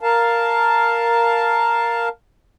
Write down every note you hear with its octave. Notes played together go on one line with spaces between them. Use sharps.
A#4 F5 A5